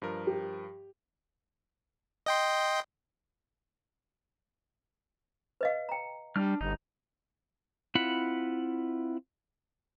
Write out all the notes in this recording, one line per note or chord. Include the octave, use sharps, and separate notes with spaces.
G2 F3 A#4
G4
D#5 G5 C6
B4 D#5 F5
G5 A#5
G3 D4 F6
G1 D#4
C4 E4 F4 F#5 B5